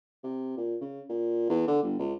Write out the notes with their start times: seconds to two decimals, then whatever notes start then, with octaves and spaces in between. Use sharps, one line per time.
0.24 C3
0.57 A#2
0.81 C#3
1.09 A#2
1.49 E2
1.67 D3
1.82 G1
1.99 C#2